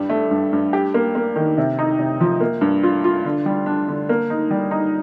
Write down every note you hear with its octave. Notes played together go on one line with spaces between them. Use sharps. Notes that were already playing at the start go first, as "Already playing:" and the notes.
Already playing: G2 G3
A3
G2
G2
G4
A#3
A#3
D#3
C3
D#4
C3
F3
A#3
G2
F4
F4
D3
G3
D4
D3
A#3
D#4
G3
D#4